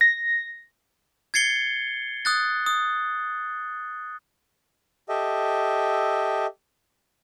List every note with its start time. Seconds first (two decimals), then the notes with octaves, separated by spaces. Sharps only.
0.01 A#6
1.34 G#6 A6 C7 C#7 G7
2.25 D#6 F#6 A6
2.66 D#6
5.09 G4 A4 D#5 E5